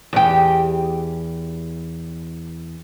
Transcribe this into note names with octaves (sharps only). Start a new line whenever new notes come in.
E2 G4